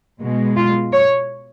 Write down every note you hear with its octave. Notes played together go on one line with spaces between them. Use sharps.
B2 G#3
F4
C#5